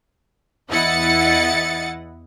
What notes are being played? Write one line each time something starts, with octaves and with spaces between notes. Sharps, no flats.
E2 E4 D#5 F#5 A6 C#7